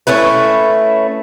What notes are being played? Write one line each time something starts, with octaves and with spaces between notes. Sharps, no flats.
A3 C#4 E4 B4